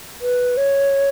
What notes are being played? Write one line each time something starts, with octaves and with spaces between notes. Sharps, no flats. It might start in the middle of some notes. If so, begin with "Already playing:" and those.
B4
C#5